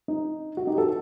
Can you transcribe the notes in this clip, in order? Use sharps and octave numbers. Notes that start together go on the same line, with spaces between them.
D#4
F#4
D#4 G4
F#4 A4